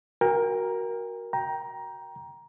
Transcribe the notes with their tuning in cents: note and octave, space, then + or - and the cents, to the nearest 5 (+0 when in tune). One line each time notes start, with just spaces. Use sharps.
F#4 +0 A#4 +10 G5 +45
G5 +0 A#5 +15